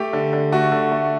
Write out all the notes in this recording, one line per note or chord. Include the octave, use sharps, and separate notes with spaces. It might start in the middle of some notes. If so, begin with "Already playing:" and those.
Already playing: A3 G4
D3
D3
A3 F#4
D3
A3